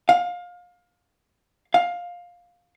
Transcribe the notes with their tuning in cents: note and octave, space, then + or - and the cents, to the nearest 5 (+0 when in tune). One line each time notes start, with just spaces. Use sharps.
F5 +25
F5 +15